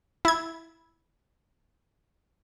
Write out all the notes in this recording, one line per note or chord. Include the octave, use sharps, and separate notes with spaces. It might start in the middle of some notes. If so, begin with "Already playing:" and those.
E4 G#6